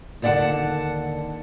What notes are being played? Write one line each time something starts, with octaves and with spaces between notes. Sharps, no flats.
D#2 D3 D5 E5 F#5 A5